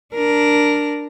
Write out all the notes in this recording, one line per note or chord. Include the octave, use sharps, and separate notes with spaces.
D4 A#4